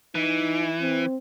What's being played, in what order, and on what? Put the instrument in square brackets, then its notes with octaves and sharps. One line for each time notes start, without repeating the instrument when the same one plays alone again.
[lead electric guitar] E3 [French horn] D#4
[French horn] C4